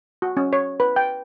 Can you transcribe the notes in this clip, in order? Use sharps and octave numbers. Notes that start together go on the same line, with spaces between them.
F#4
C#4
C#5
B4
G5